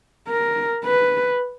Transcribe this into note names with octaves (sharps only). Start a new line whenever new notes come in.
A#4
B4